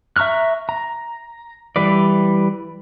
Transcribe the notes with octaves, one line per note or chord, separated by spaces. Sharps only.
E5 A#5 C#6 F6 F#6
A#5
E3 G3 B4 D5